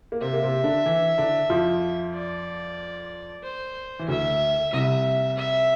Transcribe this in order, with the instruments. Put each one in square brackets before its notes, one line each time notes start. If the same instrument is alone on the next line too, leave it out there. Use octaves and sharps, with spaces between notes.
[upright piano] A#3
[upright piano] C3 C4 [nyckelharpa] E5
[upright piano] A#3
C3 C4
D3 D4
E3 E4
D3 D4
F2 F3
[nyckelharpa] D5
C5
[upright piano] E3
[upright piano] D2 D3 [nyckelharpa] E5
[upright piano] C2 C3 [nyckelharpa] E5
[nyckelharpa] E5